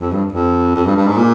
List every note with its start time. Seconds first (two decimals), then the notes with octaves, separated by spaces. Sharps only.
0.01 F2
0.12 G2
0.32 F2
0.75 F2
0.85 G2
0.96 G2
1.07 G#2
1.17 A#2